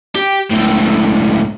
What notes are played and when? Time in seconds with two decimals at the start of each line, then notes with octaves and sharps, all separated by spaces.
0.16 G4
0.51 C#2 A2